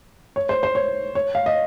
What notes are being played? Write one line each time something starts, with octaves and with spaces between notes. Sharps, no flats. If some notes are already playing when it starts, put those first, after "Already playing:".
C#5
C5
C5
C#5
C#5
F5
D#5